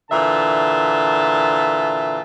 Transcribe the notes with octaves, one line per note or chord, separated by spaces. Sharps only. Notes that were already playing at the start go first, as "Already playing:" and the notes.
A#2 D3 E3 E5 A5